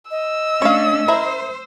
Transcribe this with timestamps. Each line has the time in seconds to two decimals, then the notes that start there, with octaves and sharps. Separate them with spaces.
0.11 D#5 E6
0.62 A3 C#4 D4 C#5 F5
1.08 E4 A#4 C5